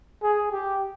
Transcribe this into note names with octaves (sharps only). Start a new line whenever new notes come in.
G#4
G4